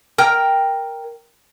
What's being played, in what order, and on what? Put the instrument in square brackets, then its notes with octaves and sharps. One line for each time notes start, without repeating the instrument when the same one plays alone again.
[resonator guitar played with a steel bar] A#4 G5